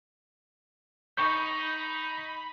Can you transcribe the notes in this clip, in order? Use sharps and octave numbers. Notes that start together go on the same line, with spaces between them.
D#4 B5 C#6 G6